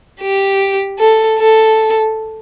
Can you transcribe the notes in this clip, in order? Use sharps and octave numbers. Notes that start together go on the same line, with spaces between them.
G4
A4
A4